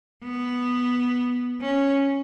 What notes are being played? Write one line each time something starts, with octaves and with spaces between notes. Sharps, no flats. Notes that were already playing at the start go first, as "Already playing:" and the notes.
B3
C#4